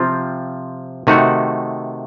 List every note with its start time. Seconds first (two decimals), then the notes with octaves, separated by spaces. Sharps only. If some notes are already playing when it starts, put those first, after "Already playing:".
Already playing: C3 F3 C4 F4
1.07 C3 D#3 A3 D#4 F#4